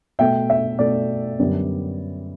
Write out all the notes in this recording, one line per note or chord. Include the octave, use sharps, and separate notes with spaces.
B2 A3 E5 G5
E5
B2 A3 D5
F#2 D3 G3 B3